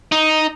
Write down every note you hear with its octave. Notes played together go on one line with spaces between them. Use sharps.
D#4